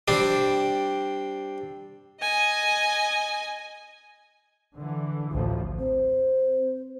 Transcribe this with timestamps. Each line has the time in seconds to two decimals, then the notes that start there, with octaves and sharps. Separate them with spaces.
0.08 G3 C4 D4
2.21 D#5 G#5
4.76 D3 E3
5.31 A1 D2 F3
5.79 C4 C5